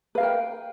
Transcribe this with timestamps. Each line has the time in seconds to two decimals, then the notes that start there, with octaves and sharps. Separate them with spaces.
0.15 B4
0.18 F5
0.20 A#4
0.23 G5